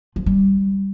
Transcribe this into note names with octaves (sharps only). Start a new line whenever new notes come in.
F3
G3